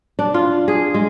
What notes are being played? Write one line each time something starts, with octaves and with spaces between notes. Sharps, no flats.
D4
F4
G#4
G#3